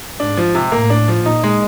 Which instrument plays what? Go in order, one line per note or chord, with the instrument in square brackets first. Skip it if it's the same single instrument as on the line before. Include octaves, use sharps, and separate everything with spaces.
[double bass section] G#2 [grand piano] D4
[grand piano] F3
C3
[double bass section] A2 [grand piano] A#3
[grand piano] D4
F3
[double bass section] A#2 [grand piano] D#4
[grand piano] G#3